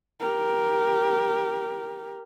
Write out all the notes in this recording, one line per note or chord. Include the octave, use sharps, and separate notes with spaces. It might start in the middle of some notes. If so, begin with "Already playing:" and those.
G4 A#4